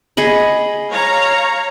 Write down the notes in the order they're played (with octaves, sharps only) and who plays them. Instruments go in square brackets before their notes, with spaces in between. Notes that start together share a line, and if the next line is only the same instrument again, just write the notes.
[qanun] G#4 D#5 B5
[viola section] C#5 F5 A#5